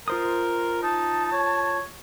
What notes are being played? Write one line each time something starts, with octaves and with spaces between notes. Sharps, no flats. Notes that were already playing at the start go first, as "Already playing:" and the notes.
F4 A#4 C5 D#6
D#4 A5
C#5